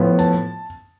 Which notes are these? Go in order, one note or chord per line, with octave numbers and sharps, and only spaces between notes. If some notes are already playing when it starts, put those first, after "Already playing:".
Already playing: A2 F3 B3
A5